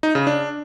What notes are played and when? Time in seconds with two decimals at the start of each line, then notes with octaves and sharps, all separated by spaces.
0.03 D#4
0.15 C#3
0.27 D4